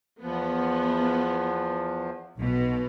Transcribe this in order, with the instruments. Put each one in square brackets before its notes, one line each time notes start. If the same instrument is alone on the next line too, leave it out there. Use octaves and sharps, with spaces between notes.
[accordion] E2 F3 [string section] B3
[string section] B1 B2